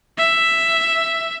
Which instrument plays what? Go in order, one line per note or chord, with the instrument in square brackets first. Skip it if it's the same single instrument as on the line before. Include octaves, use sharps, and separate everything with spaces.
[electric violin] E5